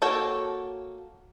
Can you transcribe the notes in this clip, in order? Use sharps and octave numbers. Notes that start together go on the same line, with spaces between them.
A#3 F#4 A4 C#5 G5